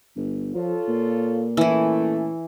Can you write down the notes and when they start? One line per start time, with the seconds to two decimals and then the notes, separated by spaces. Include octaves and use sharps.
0.16 G1
0.55 F3 F4 A4 C#5
0.88 A#2
1.57 E3 A3 C#4 E4